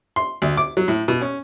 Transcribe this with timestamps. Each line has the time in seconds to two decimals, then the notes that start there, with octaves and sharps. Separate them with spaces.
0.16 C6
0.42 D2
0.57 D6
0.77 F#3
0.88 A2
1.08 B2
1.22 C#4